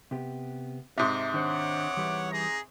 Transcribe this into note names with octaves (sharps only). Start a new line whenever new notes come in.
C3 B3 G4
G#2 C3 E5
D#3 D4 C5 C#5 F#5 D6
E3 G3 B4
G#4 A#5